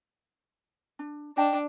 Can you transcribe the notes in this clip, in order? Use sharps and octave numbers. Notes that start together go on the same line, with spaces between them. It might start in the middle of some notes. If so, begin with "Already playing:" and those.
D4
D4 D#5 G5 A5